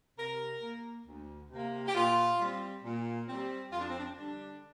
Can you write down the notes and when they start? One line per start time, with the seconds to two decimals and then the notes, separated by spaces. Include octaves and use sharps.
0.17 C3 A#4
0.62 A#3
1.06 D2
1.52 C3 A#3
1.88 G4
1.95 A#2 F4
2.40 G3 C4
2.84 A#2
3.28 G3 C4
3.72 F2 F4
3.81 D4
3.90 C4
3.98 D4
4.17 D3 G3 D4